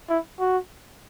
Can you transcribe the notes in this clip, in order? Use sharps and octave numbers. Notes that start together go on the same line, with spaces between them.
E4
F#4